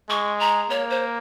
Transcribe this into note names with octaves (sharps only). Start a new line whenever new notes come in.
G#3 C#6
A#5
A#3 C#5
C5